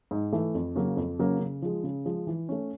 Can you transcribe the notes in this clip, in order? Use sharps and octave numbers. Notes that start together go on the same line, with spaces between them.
G#2
E3 A3
F2
C#3 F#3 A#3 C#4
F2
C#3 F#3 A#3 C#4
C#3
F3 G#3
C#3
F3 G#3
E3
A3 C#4